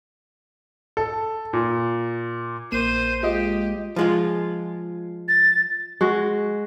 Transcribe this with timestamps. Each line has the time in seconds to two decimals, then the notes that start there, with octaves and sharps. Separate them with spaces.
0.97 A4
1.53 A#2
2.72 A#1 A#3 C5 D#7
3.23 G#3 F4 G4 D#5
3.96 F3 G#3 F4
5.28 A6
6.01 G#3 F#4